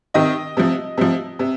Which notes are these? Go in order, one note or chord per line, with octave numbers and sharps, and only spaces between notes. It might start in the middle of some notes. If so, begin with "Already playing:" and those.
C3 D#3 D#5 D#6
C3 F3
C3 F3
C3